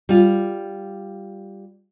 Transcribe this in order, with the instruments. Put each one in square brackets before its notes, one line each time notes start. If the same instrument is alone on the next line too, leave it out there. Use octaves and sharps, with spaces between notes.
[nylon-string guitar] G3 F4